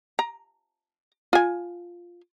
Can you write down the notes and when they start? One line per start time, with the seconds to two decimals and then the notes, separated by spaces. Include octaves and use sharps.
0.19 A#5
1.33 F4 G#5